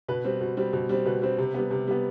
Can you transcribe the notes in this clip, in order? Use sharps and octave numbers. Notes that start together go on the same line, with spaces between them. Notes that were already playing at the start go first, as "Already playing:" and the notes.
B2 B4
G3 C4
B2
G3 C4
B2
G3 C4
B2 B4
G3 C4
C3
G3 B3
C3
G3 B3